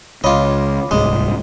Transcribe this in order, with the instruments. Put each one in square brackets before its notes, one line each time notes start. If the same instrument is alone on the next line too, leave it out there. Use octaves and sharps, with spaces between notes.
[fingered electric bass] C#2 [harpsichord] F4 D#5 [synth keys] C#5 B5 D6
[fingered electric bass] D1 C2 G#2 [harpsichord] G#3